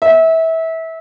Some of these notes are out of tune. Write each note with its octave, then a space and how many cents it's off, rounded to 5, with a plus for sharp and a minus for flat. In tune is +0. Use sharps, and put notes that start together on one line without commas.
E5 -25